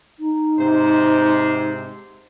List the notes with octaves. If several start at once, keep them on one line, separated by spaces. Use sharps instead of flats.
D#4
G#2 C3 C5